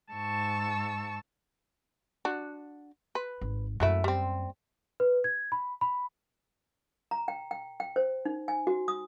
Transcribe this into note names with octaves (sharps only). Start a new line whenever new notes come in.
G#2 A5 C#6 E6
D4 F#4
B4
G#1
F#2 F#3 A3 A#3 E4
G3 C4
B4
G#6
B5
B5
A#5
G5
G5
G5
C5
D#4
G#5
F#4
D#6